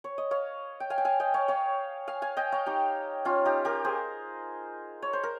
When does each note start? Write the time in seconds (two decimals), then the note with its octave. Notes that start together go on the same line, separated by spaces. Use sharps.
0.04 C#5
0.18 D#5
0.31 C#5 F5
0.80 G5
0.90 F5 G#5
0.98 G5
1.05 F5 G#5
1.20 D#5 G5
1.34 C#5 F5
1.48 C#5 F5
2.08 F5 G#5
2.22 F5 G#5
2.37 D#5 G5
2.52 C#5 F5
2.66 D#4 G4
3.25 C#4 F4
3.45 D#4 G4
3.65 G4 A#4
3.84 G#4 C5
5.02 C#5
5.13 C5
5.23 A#4